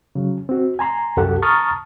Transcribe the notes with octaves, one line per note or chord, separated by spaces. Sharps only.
C#3 F#3
C4 F#4
G#5 A#5 C6
C2 F#2 F#3 G4 A4 F#5
A5 A#5 C#6 D#6 F6 A6